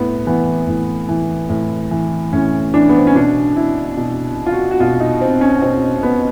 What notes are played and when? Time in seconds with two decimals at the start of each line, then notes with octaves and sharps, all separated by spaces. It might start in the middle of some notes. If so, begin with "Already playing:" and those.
Already playing: A2 B3
0.27 E3 B3
0.68 A2
1.09 E3
1.49 A2
1.91 E3
2.33 A2 C#4
2.74 E3 D4
2.89 B3
2.98 C4
3.07 C#4
3.15 B2 D4
3.56 E4
3.97 B2
4.46 F4
4.52 F#4
4.71 F#4
4.80 B2 F4
5.00 D#4
5.21 C4
5.41 C#4
5.62 B2 C4
6.03 B3